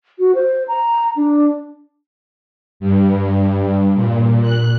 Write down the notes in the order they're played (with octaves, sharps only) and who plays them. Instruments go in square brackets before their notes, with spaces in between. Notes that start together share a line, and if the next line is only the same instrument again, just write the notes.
[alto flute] F#4
C5
A#5
D4
[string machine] G2
A#2
F#6